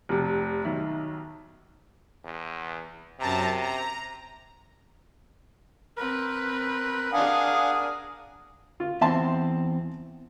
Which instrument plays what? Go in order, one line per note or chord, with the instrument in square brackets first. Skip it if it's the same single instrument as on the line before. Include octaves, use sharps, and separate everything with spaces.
[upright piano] F1 C3
B1 D#3 E5
[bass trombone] E2
[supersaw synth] F#2 A5 A#5 [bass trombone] C3
[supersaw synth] A#5
[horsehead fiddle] C4 B4 [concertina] A#4
[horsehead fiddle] D4 G#4 [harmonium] F5 F#5 G#5 [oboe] D#6
[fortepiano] F4
[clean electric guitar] E2 C4 [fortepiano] E5 A5 C6